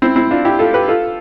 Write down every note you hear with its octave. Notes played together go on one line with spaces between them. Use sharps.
C4 E4
C4 E4
D4 F4
E4 G4
F4 A4
G4 B4
F4 A4